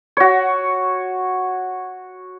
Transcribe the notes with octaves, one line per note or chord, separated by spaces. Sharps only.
F#4 C#5